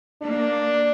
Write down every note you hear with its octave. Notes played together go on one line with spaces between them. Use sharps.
A#3 D4